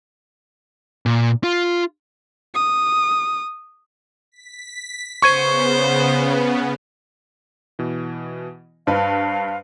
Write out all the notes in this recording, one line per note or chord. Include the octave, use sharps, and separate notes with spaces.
A#2
F4
D#6
B6
C#3 B3 C5 C#6 G#6 D#7
B2 E3
G2 B4 C5 F5